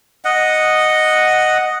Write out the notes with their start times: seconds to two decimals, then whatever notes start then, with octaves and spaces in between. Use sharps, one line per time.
0.25 D#5 F#5